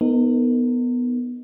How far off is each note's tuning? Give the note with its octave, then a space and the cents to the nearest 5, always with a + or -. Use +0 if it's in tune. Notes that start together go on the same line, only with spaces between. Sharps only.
B3 +0 D#4 +0 A#4 -40